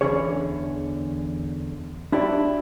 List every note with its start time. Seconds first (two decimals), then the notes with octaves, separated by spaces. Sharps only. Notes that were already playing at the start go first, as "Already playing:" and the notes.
0.01 E2 D3 E3 C#4 G#4 C#5
2.12 D4 E4 F#4 G4 D5